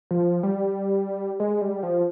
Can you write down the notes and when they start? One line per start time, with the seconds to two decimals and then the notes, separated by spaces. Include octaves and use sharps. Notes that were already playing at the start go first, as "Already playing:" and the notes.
0.11 F3
0.43 G3
1.40 G#3
1.62 G3
1.83 F3